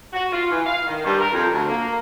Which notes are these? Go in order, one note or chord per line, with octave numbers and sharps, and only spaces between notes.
F#4
F4
E3
F5
D#3
G2
A#4
F2
D2
A#3